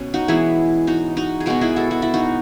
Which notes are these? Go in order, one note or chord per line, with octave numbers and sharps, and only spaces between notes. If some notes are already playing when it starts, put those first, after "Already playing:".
Already playing: B2 C#4
D#4 F#4
E3 G#3 B3 E4 G#4
D#4 F#4
D#4 F#4
G#4
B2 G#3 B3 D#4 F#4
E4 G#4
F#4 A4
F#4
E4
D#4 F#4